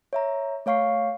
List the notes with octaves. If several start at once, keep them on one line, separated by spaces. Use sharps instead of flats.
C#5 E5 A#5
A3 C#5 F5 C#6 C7